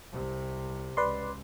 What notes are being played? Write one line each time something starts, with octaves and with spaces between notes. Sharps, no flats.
C2 C3
C#2 B4 D5 C6